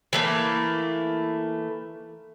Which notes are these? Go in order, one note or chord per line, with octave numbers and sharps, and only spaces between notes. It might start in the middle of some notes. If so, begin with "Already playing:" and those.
E3 A3 A#3